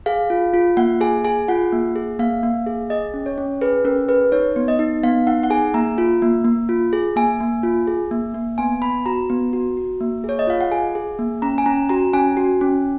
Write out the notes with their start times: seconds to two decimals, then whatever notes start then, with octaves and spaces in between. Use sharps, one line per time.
0.06 G#4 F5
0.30 F4
0.54 F4
0.77 A#3 F#5
1.01 G#4 G#5
1.24 G#4 G#5
1.48 F4 F#5
1.72 A#3
1.96 G#4
2.19 A#3 F5
2.43 A#3
2.67 G#4
2.90 G#4 D#5
3.14 C#4
3.26 C#5
3.38 C#4
3.61 G#4 B4
3.84 C#4 A#4
4.08 G#4 B4
4.32 D#4 C#5
4.56 B3
4.68 D#5
4.79 D#4
5.03 B3 F5
5.27 D#4 F#5
5.43 F#5
5.50 G#4 G#5
5.74 A#3 A#5
5.98 F4
6.22 A#3
6.45 A#3
6.69 F4
6.93 G#4
7.16 A#3 G#5
7.40 A#3
7.63 F4
7.87 G#4
8.11 A#3
8.34 A#3
8.58 B3 G#5
8.82 B3 B5
9.06 F#4 A#5
9.30 B3
9.53 F#4
9.77 F#4
10.00 A#3
10.24 G#4 C#5
10.39 D#5
10.47 F4 F5
10.61 F#5
10.72 G#4 G#5
10.95 G#4
11.19 A#3
11.42 C#4 A#5
11.58 G#5
11.66 C#4 A#5
11.89 F#4 A#5
12.13 C#4 G#5
12.37 F#4
12.61 C#4